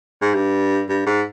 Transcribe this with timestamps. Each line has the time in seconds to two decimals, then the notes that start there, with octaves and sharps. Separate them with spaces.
0.22 G#2
0.34 G2
0.89 G2
1.06 G#2